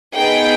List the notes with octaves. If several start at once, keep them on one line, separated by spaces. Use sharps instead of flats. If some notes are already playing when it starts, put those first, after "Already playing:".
B3 D#4 G#4 G5